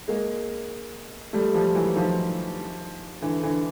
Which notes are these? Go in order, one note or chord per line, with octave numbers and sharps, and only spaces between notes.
G#3 A#3
G3 A3
F3 G3
E3 F#3
D#3 F3
D3 E3
D3 E3